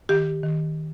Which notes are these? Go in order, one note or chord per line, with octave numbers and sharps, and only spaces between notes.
D#3 G4
D#3